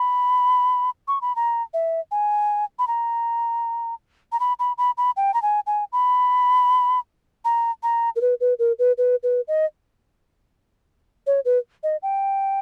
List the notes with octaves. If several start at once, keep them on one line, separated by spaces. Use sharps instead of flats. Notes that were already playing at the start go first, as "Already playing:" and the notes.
Already playing: B5
C#6
B5
A#5
E5
G#5
B5
A#5
A#5
B5
B5
B5
B5
G5
A#5
G#5
G#5
B5
A#5
A#5
A#4
B4
B4
A#4
B4
B4
B4
D#5
C#5
B4
D#5
G5